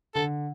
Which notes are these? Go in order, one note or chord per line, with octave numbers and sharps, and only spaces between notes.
D3 A4